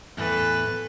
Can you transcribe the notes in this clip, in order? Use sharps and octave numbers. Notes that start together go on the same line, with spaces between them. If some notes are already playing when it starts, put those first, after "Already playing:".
E2 A2 E3 A4 B4